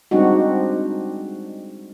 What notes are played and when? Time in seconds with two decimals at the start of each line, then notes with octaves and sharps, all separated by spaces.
0.11 G3 G#3 C4 D4 D#4 F#4